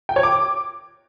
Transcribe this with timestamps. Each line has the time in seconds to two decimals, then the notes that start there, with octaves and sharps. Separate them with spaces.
0.09 G5
0.16 C#5
0.23 D6